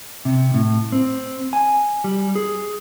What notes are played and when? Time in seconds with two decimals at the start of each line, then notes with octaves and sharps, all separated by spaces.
0.25 C3
0.54 A2
0.92 C4
1.53 G#5
2.04 G3
2.35 G#4